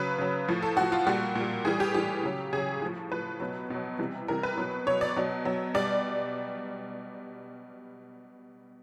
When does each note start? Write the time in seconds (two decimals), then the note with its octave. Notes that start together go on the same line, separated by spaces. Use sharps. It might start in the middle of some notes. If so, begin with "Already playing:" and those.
Already playing: C#3 F#3 B4
0.18 C#3 F#3
0.48 A2 F3
0.62 A4
0.77 A2 F3 F#4
0.92 F4
1.07 A#2 G3 F#4
1.35 A#2 G3
1.65 A2 E3 G3 G#4
1.80 G4
1.94 A2 E3 G3 G4
2.23 C#3 F#3
2.53 C#3 F#3 G#4
2.81 A2 F3
3.11 A2 F3 B4
3.40 B2 F#3
3.70 B2 F#3
3.99 C3 E3 G3
4.28 C3 E3 G3 A#4
4.43 B4
4.57 B2 F#3
4.86 B2 F#3 C#5
5.01 D5
5.16 B2 F#3
5.45 B2 F#3
5.74 B2 G3 D5